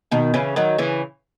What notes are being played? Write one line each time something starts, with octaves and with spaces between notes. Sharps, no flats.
B2 D#3
C#3 E3
D#3 F#3
C#3 E3